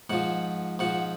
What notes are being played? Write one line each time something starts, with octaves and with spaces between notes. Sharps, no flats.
G#2 F3 F#5
G#2 F3 F#5